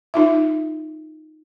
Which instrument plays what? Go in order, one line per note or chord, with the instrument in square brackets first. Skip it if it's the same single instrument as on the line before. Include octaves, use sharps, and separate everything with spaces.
[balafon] D#4 F4 E5